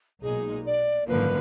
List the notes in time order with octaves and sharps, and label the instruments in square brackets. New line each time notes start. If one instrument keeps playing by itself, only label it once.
[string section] B1 A#2 G#3 D#4 [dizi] G#4
[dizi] D5
[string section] G#1 F#2 D3 F3 A#3 [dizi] B4